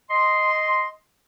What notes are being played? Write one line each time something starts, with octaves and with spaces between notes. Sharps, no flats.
D#5 C6